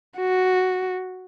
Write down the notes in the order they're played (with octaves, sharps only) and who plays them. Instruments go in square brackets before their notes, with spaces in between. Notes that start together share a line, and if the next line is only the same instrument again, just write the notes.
[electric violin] F#4